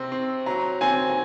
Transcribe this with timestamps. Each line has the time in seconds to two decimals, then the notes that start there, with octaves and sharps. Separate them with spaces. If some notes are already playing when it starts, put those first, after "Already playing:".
Already playing: C3 C4
0.12 C4
0.46 F#3 A#5
0.81 C4 G#5
1.10 G#5